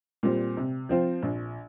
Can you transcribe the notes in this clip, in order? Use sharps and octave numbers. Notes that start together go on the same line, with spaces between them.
A#2 G3 C4
C3
F3 C4 F4
A#1